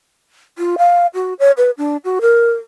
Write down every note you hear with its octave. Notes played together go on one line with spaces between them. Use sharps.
F4
F5
F#4
C#5
B4
D4
F#4
A#4